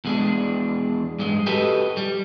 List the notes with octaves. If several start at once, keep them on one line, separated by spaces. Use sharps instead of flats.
E2 G#3 D4
G2 G#3
F#4 G4 A4 B4 D#5
G3